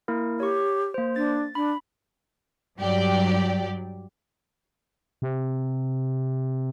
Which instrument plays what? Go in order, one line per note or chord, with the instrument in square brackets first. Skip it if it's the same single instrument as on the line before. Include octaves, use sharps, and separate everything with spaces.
[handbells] A#3 E4 A#4
[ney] G4 [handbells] C#5 C#6
[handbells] A#3 C5
[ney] D4 [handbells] A6
[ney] D4 [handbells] B5
[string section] G2 F#3 G4 D5
[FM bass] C3